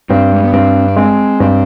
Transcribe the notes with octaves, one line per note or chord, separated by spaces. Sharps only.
G2 C4
G#3
B3
G2 C4
D4
G#3 C4
G2 C4